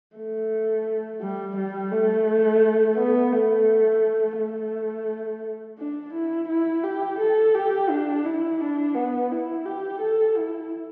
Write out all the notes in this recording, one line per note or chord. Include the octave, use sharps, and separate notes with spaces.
A3
G3
G3
A3
B3
A3
A3
D4
E4
E4
G4
A4
G4
D4
E4
D4
B3
E4
G4
A4
E4